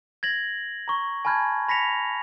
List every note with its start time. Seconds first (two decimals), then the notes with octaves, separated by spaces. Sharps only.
0.23 G#6 A#6 F#7
0.88 A#5 C#6
1.25 G#5 A5 B5 F6 G6 G#6
1.69 B5 A#6 B6 C#7 F7